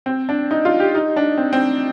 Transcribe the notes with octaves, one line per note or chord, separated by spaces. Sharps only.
C4
D4
D#4
F4
G4
D#4
D4
C4
C4